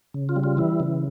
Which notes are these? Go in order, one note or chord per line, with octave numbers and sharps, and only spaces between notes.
C#3
F4
G3
F4
E3 E4
C#3